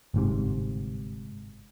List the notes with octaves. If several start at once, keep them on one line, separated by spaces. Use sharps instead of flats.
G1 G#2 C3